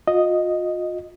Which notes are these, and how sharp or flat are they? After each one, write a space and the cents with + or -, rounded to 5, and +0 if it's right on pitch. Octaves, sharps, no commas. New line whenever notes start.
F4 +40 D#5 +0